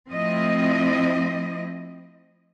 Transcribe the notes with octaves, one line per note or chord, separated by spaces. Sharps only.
F3 A3 C4 E4 D#5